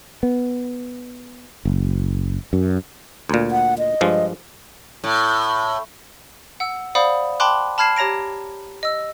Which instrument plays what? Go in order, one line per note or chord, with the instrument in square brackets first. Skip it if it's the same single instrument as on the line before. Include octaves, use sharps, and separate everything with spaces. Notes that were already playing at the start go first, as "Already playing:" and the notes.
[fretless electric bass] B3
F#1
F#2
[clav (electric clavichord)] D2 A#2
[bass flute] F#5
D#5
[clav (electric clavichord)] G2 F3 G#3
[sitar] A2
[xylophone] F#5 E6
C5 D5 F5 F#5 B5 D#6
G5 A5 B5 C6 D6 F#6
A5 B5 F6 G#6 C7 E7
G4 C#5 A#5 A#6 D7
D#5 E6